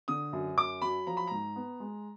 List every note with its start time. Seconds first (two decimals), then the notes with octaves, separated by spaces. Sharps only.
0.08 D3 D#6
0.33 F#2
0.57 F#2 D6
0.82 F#3 B5
1.07 F3 A#5
1.17 B5
1.27 G#2 A#5
1.56 B3
1.80 G#3